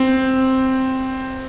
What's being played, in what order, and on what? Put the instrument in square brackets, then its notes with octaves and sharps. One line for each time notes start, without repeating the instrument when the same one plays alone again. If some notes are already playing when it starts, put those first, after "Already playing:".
Already playing: [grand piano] C4